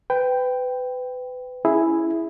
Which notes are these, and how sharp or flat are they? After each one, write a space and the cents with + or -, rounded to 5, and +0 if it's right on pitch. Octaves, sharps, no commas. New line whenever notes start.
B4 +25 G5 +0
C#4 +0 E4 +0 G#4 +0